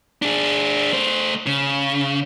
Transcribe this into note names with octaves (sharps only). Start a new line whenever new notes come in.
D4 G#4
A3 C5
C#3